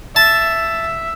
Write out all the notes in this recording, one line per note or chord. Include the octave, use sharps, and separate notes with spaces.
E5 A5